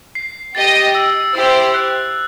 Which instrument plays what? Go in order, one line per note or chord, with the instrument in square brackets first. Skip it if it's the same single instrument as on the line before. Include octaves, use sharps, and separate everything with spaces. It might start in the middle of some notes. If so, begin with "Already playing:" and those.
[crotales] C7
[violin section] G4 D#5 G5 [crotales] A6
[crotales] E6
[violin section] E4 G4 C5 [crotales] E6
[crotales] F#6